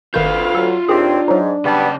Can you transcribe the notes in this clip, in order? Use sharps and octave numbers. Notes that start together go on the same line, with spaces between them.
G#1 D2 D#3 F4 B4 E5 F5 G6
F#3 A4
D#2 A#2 C4 D4 G4 G#4
G#2 F#3 D#4
C#3 G3 B3 A5